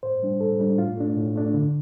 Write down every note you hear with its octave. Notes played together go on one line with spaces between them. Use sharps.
A2 C5
G3 D4
A2 A4
G3 D4
A2 F4
A3 D4
A2
A3 D4
D3